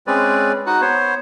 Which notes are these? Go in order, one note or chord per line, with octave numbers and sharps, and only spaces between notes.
G#3 C4 C#4 B4 D5
D#4 F#4 F#5
B3 C5 C#5